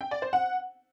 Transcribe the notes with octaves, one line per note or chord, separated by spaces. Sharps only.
G5
D5
C5
F#5